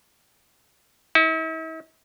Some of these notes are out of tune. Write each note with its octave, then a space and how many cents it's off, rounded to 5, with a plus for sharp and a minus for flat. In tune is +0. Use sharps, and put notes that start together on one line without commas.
E4 -45